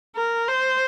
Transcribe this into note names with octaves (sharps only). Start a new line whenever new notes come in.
A#4
C5